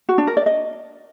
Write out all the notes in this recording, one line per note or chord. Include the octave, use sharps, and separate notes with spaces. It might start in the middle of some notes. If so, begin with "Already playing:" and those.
F#4
D4
A#4
D5
D#5